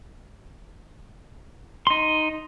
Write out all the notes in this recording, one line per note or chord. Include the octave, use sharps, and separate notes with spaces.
D#4 C6